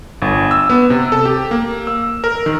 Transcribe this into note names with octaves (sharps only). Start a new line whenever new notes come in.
G1
E6
B3
C3
A4
G4
A#3
E6
A#4
D#3